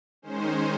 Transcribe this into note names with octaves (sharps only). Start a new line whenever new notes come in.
D#3 G#3 C#4 C5